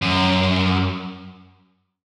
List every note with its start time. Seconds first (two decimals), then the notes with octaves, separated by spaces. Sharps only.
0.02 F#2